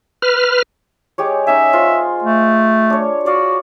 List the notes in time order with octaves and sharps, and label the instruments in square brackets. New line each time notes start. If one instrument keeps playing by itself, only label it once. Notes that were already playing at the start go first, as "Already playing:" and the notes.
[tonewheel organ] B4 F6
[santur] G#3 G4 C#5
[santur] C#4 D#4 G#5 [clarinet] E5
[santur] F4 C5 C6
[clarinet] A3
[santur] D4 C#5
[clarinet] F#4 [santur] C#5 D5 F5